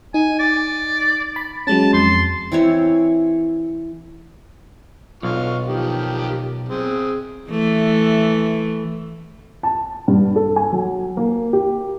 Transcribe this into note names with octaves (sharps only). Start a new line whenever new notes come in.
D#4 G#5
D5
B5
F#3 G#3 C#4 A5
F2 C6
E3 C4 E4 C#5
B1 D3 F4 C#6
D#3 F3 G4
C4 G#4
E3 A3
A5
G2
A4
G#5
F#3
A#3
G4